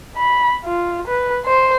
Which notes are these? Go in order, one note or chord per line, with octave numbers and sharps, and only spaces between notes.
B5
F4
B4
C5